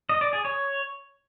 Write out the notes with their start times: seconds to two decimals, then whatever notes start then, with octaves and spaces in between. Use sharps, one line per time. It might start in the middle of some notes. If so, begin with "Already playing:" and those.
0.09 D#5
0.21 D5
0.33 G#4
0.45 C#5